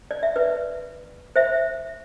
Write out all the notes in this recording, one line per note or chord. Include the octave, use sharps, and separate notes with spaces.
D5
E5
B4 D5
C5 E5